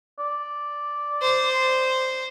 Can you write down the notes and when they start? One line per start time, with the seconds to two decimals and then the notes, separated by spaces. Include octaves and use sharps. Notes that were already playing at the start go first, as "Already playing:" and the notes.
0.19 D5
1.22 C5